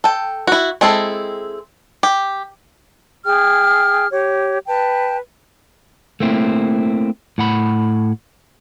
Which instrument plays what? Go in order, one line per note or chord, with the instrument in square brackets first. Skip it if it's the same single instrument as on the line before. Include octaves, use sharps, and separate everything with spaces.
[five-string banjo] A4 G5
E4 F#4
G#3 C4 E4 A4
G4
[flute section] G#4 G5 F6
G4 C#5
B4 G5 A5
[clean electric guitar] A3 A#3 C4 E4
A2 F#5 B5